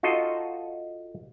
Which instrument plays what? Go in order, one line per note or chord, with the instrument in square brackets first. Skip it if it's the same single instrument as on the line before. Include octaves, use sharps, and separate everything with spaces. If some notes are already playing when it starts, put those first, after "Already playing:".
[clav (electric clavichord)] D#4 F4 F#4 A4 D#5